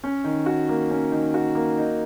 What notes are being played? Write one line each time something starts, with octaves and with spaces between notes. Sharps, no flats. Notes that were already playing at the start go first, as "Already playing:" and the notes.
C#4
D#3
F#4
A#3
C#4
D#3
F#4
A#3
D#4